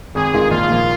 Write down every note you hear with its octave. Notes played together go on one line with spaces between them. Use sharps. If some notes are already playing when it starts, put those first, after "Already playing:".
G#1 G#4
G#2 D#3 G#3 F4
A#1 F4
A#2 F3 A#3